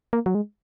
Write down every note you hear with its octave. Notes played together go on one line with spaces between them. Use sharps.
A#3
F#3
G#3